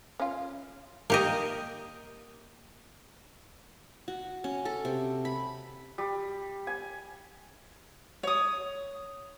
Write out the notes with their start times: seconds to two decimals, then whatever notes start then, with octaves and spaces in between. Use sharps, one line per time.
0.20 C#4 F4
1.10 A#3 G4 D#5
4.08 F#4
4.44 C#4
4.65 A4
4.85 C3
5.25 B5
5.98 G3
6.67 G#5
8.23 C#5 D#6